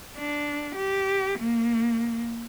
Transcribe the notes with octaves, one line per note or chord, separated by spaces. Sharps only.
D4
G4
A#3